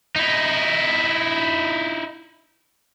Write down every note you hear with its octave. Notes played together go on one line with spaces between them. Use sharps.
D#4 E4